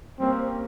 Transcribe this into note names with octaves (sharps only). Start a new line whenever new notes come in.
G3 A#3 C4 C#4